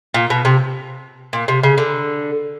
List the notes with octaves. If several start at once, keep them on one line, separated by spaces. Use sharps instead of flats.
A#2
B2
C3
A#2
C3
C#3
D3